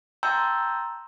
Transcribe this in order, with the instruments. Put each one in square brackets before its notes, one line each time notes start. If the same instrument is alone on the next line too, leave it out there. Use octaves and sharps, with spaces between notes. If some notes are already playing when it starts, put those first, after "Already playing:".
[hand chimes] G5 A5 A#5 C6 E6 G6